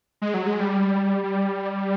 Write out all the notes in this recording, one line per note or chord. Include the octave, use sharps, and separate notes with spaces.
G#3
F#3
G#3
G3
G3